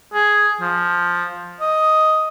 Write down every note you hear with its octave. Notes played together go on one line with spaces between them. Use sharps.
G#4
F3
D#5